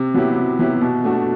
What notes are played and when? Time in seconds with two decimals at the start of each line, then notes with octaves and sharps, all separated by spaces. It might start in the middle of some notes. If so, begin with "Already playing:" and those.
Already playing: C3
0.14 F#3 B3 E4 G4
0.36 C3
0.59 F#3 B3 E4 G4
0.81 B2
1.04 A3 D4 F#4